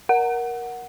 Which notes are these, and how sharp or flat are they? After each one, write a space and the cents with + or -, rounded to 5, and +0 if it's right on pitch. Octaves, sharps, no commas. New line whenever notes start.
A#4 +15 F#5 +0